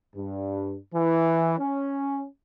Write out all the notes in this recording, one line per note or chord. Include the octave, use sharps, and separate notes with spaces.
G2
E3
C#4